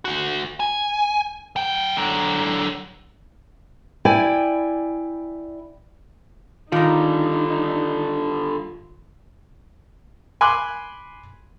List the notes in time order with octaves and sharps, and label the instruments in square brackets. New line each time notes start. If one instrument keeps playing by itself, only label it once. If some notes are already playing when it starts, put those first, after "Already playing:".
[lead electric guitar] D2 F#4
G#5
F#3 G5
D3 F#3
[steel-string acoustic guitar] E4 D5 G5 G#5
[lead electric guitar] D3 G3 [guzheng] D#3 A#5 [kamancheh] D#4 [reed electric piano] F4
[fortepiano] G#5 B5 C6 D6 F#6